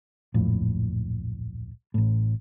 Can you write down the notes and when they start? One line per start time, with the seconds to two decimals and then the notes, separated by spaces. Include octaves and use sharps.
0.34 D1 A#1 F2 A2
1.94 A1 A2